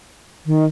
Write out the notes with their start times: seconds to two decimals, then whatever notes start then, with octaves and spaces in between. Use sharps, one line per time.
0.46 D#3